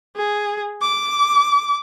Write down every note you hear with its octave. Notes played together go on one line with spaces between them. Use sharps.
G#4
D6